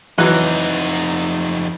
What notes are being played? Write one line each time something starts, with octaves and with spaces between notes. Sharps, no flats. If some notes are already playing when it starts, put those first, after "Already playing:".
F2 E3 F#3 D#4 F#6